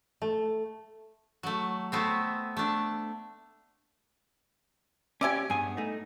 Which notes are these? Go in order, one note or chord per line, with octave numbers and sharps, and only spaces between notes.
A3
F#3 A3
A3 B3 C4
A3 D4
C#4 G4 D5 E5 G#5
G2 B3 G#4 G#5
A3 D#4